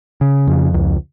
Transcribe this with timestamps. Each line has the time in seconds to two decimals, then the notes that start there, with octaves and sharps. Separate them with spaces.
0.21 C#3
0.47 F2
0.74 C#2